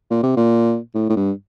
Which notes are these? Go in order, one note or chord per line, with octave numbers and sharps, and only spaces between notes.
A#2
C3
A#2
A2
A2
G2